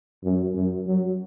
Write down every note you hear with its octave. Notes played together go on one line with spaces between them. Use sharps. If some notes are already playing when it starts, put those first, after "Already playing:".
F#2
F#2
F#3